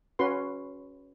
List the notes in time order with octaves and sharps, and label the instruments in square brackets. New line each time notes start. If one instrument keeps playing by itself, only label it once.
[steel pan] C#4 F#4 B4 C6